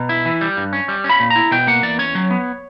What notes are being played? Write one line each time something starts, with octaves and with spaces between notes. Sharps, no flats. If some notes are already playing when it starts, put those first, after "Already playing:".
Already playing: B2 A#5
E4
E3
G3
G2
C#4
G3
C#4
B5
A#2
A#5
E4
B2 G5
A#3 F#5
E2 D5
C#4 C#5
F#3
B3